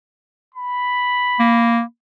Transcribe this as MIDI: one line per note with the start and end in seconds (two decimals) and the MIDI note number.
0.55 1.83 83
1.39 1.82 58